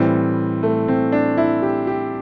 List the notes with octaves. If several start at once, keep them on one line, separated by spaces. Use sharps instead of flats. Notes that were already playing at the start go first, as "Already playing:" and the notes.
Already playing: A2 E3 G3 C4
A3
C4
D4
E4
G4
G4